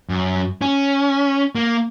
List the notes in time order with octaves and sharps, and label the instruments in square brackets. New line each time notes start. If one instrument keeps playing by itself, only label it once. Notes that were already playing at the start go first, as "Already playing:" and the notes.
[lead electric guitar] F#2
C#4
A#3